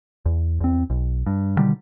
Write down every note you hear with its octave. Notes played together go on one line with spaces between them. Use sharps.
E2
E2 C4
B1
G2
B2 D3 D#3 G3